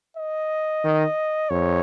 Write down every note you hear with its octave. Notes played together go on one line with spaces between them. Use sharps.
D#5
D#3
F2 C#5